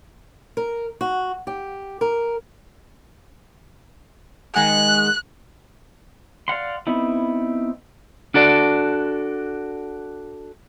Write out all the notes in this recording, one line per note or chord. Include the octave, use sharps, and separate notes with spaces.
A#4
F#4
G4
A#4
D#3 G#3 F#5 G#5 F#6
D5 F5 F#5 C6
B3 C4 D#4 E4
D4 F#4 A4 D5